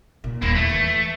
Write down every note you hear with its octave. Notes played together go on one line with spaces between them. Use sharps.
A#2
D#1 E2 A#3 E4
A3 E4
E3